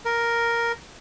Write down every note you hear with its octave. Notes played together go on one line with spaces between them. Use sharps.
A#4